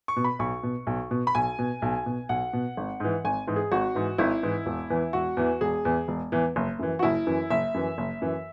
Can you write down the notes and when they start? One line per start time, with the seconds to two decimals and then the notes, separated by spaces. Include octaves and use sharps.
0.08 C#6
0.17 B2
0.24 B5
0.39 B1 C#6
0.63 B2
0.87 B1
1.11 B2
1.27 B5
1.35 B1 G#5
1.59 B2
1.82 B1
2.06 B2
2.29 B1 F#5
2.53 B2
2.77 G#1
3.00 G#2 E3
3.25 G#1 G#5
3.47 G#2 E3
3.56 G#4
3.72 G#1 F#4
3.95 G#2 E3
4.18 G#1 E4
4.43 G#2 E3
4.66 E1
4.90 E2 E3
5.13 E1 F#4
5.37 E2 E3
5.61 E1 G#4
5.85 E2 E3
6.08 E1
6.32 E2 E3
6.56 F#1
6.79 F#2 E3
6.99 F#4
7.03 F#1 E4
7.27 F#2 E3
7.50 F#1 E5
7.74 F#2 E3
7.98 F#1
8.22 F#2 E3